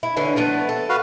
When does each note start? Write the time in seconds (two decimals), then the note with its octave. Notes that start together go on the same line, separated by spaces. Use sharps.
0.03 E4
0.17 D3 E3 C#4
0.36 F3 A3 B3
0.69 A4
0.89 F#4 B4 F5